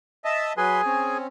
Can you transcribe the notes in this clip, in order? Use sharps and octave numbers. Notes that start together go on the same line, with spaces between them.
D#5 E5 A5
F#3 G#4 B4 G#5 C6
C4 C#4